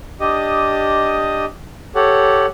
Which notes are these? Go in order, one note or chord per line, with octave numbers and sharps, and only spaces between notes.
D4 G4 D#5 D#6
G4 A4 C#5 F#5